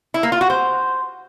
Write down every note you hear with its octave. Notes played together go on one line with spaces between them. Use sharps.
E4
A#3
F4
F#4
C5